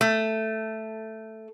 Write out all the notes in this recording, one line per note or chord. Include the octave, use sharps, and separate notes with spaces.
A3